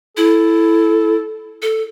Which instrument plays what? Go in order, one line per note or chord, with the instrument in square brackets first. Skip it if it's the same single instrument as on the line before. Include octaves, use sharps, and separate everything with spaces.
[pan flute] E4 [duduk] A4
[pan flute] A4